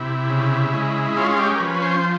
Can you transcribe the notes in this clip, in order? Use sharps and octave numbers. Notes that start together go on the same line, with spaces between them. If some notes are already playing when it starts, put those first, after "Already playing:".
Already playing: C3 E4
C#3
G#3
C#4 F4
G4
A#4
F3 B4
C5